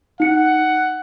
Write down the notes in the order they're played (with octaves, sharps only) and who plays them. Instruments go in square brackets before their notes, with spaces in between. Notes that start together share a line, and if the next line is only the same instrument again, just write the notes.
[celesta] D#4 C#7 [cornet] F#5